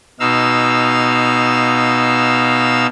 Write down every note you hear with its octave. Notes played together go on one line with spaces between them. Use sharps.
B2 D#4 F5 E6